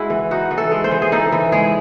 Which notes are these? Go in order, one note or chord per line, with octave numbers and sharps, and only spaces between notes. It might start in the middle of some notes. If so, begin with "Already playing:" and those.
Already playing: G#3 E4 F#4 G#4
E3
D#4 F#4
E3
A4
G#3
C5
E3
G#4
D#4 A4
E3
G#3 G#4